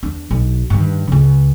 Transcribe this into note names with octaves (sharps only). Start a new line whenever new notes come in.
E2 D4
B1
G2 D#3
C#2 C#3